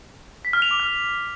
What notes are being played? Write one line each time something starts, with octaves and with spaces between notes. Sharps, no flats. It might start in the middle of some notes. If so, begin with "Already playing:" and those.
B6
F6
F7
D6
F6